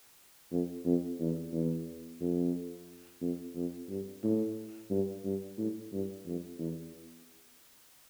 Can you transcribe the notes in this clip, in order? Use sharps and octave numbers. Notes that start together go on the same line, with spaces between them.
F2
F2
E2
E2
F2
F2
F2
G2
A2
G2
G2
A2
G2
F2
E2